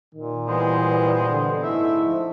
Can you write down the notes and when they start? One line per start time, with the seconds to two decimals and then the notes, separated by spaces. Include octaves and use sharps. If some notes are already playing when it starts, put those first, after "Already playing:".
0.14 A#2 D#3
0.48 E3 G3 G#3 B3 C5
1.29 D3
1.63 G#2 G#3 A3 E4 E5
2.01 F3